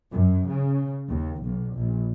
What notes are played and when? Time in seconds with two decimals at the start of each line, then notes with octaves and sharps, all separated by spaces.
0.12 F#2
0.47 C#3
1.09 D#2
1.42 B1
1.75 A#1